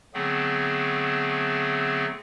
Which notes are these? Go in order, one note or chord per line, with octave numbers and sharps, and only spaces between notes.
D3 F#3 A3 B3 C4 G#4